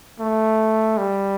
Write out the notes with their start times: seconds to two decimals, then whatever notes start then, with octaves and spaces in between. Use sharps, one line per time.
0.20 A3
0.97 G3